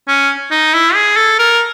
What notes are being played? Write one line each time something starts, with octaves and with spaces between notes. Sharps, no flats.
C#4
D#4
E4
G#4
A4
A#4